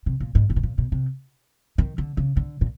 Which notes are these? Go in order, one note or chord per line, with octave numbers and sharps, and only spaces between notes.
C3
A#2
G#2
A2
B2
A#2
B2
C3
D#3
D3
C#3
D3
A#2